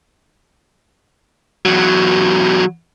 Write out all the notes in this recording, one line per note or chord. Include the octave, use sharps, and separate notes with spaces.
E2 F#3